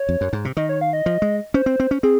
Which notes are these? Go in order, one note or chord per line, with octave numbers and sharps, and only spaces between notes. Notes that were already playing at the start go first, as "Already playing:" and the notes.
Already playing: C#5
F2
F#2
G#2
C3
D#3 D#5
C#5
F5
D#5
F3
G#3
C#4 C5
C4
C4
C#4
C4 G#4